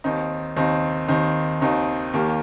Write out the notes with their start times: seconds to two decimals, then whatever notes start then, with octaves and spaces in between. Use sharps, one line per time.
0.04 D#2 D#3 C4 D#4
0.57 D#2 D#3 C4 D#4
1.08 D#2 D#3 C4 D#4
1.61 D#2 D#3 C4 D#4
2.13 D#2 D#3 A#3 G4